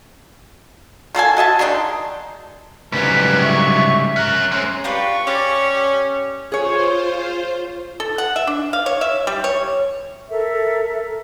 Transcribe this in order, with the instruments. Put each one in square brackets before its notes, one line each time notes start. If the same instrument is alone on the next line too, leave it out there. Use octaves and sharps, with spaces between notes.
[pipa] D#3 A#3 A4 G#5
F#4 D#5 E5 A5
D#3 G#3 D4 D#4
[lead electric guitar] C2 F#3 [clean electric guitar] G#2 C#3 G3 [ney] B4 [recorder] B6
[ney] E5 [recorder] C#6
[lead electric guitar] C#4 A#4 [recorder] F#6
[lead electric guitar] G#3 C4 [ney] C#4
[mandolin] D4 F4 B4 [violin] G4 C#6
[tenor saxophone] C#4 [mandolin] D5
[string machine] F4 C5 [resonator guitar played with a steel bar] G#4 C#5
[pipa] A4
F#5
E5
D4
F5
C#5
E5
G3
C#5
[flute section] A4 A#4 E5